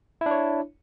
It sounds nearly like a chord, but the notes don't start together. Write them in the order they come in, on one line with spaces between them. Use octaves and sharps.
E4 D4 C#5